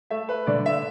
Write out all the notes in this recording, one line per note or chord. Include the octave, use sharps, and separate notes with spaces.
A3 E5
B4
D3 D5
E5